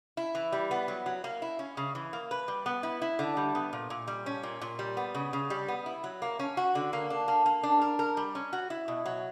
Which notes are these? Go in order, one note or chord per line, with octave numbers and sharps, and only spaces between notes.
E4
E3
G3
B3
F#3
F#3
A#3
E4
C#4
C#3
E3
A#3
B4
G3
B3
E4
E4
D3
G3
B3
A#2
A#2
G3
C#4
A#2
A#2
G3
B3
C#3
C#3
G3
B3
E4
F#3
A#3
C#4
F#4
D3
A#3
D4
A#3
A#3
D4
A#4
A#4
G3
C#4
F#4
E4
B2
F#3